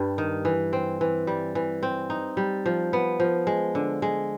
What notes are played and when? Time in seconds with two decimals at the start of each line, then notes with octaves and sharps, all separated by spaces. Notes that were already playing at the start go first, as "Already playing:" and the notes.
Already playing: G2 G3
0.18 D#3
0.45 E3
0.73 C4
1.01 E3
1.27 G3
1.55 E3
1.83 C4
2.10 D#4
2.37 G3
2.66 F3
2.93 B3
3.20 F3
3.47 G#3
3.75 D3
4.02 G#3